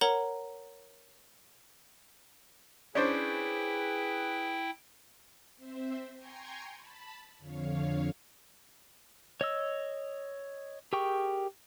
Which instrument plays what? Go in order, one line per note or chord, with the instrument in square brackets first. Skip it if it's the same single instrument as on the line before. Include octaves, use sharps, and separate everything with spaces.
[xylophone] A#4 C#5 F#5 A#5 F#7
[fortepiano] C#4 D4 C5 [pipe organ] E4 G5 [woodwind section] G#4 B4
[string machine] C4 C5 E5
G5 G#5 A#5 C6 C#6 G#6
A5 B5
F2 D3 C#5 F5
[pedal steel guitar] C#5 D#5 E6
G4 G#4 A#4 G5 C#6